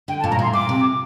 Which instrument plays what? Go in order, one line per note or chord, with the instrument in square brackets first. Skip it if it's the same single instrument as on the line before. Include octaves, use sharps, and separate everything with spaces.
[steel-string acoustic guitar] D3 [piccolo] G5
[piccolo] A5
[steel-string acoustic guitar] A#2
[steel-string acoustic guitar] G2 [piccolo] A#5
[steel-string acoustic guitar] A2 [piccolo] C6
[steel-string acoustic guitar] A#2 [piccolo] D6
[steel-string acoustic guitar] C3